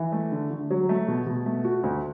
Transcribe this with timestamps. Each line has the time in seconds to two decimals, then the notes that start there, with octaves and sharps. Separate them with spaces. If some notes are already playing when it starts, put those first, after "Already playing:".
Already playing: E3
0.12 A3
0.32 D3
0.51 D3
0.71 F#3
0.89 A3
1.08 B2
1.26 B2
1.46 A3
1.65 F#4
1.83 D2